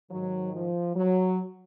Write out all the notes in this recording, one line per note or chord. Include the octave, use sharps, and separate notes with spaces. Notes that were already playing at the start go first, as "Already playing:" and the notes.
G#2 D#3 F#3
F3
F#3